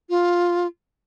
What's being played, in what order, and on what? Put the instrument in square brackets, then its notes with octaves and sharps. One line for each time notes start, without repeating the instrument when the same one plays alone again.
[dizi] F4